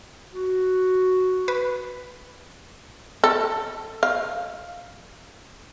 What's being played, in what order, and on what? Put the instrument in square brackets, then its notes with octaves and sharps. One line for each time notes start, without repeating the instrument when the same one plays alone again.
[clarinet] F#4
[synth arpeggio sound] B4
[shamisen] A4
F5